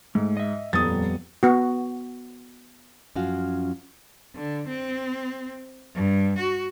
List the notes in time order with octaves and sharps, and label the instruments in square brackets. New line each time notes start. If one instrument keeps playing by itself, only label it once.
[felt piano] G#2 [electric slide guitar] A3
[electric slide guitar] D#5 E5
[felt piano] D#1 D#6 A6 [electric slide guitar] F2 G3 B3
[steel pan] B3 F#4
[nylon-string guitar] F#2 F3 C#4 F4 F#4 F5
[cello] D3
C4
G2
F#4